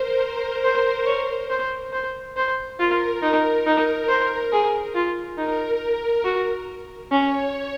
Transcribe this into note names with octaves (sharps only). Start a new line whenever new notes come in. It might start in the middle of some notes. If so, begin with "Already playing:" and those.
Already playing: A#4 C5
A#4
C5
C#5
C5
C5
C5
F4 A#4
D#4
D#4
C5
G#4
F4
D#4 A#4
F#4
C#4 C#5